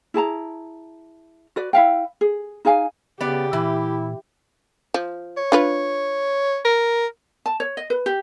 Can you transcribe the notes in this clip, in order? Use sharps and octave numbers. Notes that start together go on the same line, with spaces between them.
E4 G#4 A5 A#5
F#4 B4 D5
E4 E5 F5 G5
G#4
D#4 G#4 F5 G#5
C#3 B3 G4 D5
A#2 E3 E4
F3
C#5
D4 F4 B4
A#4
A5
C#5
D#5
B4
G4